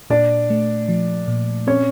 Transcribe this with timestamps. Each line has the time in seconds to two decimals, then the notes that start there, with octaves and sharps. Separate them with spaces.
0.10 A#2 D4 D5
0.50 A3
0.88 F3
1.28 A#2
1.67 C4 C#4 C#5